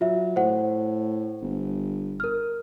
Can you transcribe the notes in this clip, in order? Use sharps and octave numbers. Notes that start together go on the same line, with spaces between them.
F#3 F4 E5
A2 C5 F#5
G1
A#4 F6